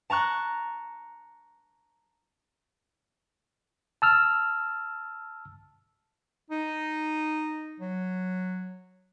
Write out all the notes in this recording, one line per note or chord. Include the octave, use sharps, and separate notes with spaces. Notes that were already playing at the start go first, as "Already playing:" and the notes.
A5 A#5 C#6 F#6
A5 E6 F6
D#4
F#3